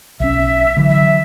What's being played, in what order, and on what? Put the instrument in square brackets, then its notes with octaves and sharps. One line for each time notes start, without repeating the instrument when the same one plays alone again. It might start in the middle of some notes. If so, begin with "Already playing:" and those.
[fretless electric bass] B1 C#4 [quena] E5
[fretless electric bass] D3 E3 F#3
[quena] E5